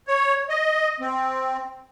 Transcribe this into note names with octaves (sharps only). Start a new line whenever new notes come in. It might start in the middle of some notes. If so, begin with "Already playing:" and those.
C#5
D#5
C4